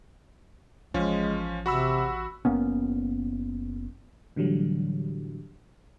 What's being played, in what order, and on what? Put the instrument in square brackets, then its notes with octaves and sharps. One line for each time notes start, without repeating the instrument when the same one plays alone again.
[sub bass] A1 [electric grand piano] F3 C#4 [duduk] G#3
[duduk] C3 [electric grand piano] F#4 B5 E6
[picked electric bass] F#1 A#3 B3 C#4
[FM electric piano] A2 D3 E3 F#3 G3